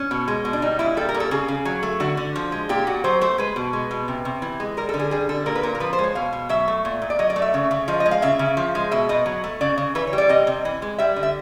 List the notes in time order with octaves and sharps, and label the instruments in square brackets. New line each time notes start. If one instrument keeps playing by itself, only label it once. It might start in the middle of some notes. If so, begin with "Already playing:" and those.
Already playing: [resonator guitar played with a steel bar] C#4
B2
G#3
B2
D4
G3 D#4
A#2 E4
G3 A4
A#4
A#2
A4
C#3 G#4
C#3
F#3
A3
D3 F#4
D3
F3
G#3
A#2 G4
A#2 F#4
F#3 C5
A3 C5
G#3 B4
B2
G#3
B2
C3
C3
E3
G#3
G3 A#4
D3 A4
G#4
G3 G#4
D3 A4
A#2 A#4
B4
A#2 A#4
A#4
F3 B4
C5
G#3
C#5
B2 F5
B2
F#3 E5
A3
A#2
A#2
D5
F#3 D#5
D5
A3
E5
C#3
C#3
F3 D#5
D#5
G#3
F5
C#3 E5
C#3
F3
G#3
B2 E5
B2 D#5
F#3
A3
C#3 D5
C#3
E3 B4
C#5
G3
D5
C3 D#5
C3
E3
G#3
G3 E5
D3
E5